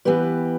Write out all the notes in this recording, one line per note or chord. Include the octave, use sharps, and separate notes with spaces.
E3 B3 G4 B4